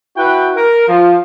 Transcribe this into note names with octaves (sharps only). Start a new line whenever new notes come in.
E4 F#4 B4 G5
A#4
F3